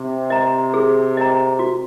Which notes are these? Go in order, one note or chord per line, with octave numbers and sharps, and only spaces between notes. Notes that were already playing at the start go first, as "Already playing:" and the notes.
Already playing: C3
D#5 A#5
G#4
D#5 A#5
F#4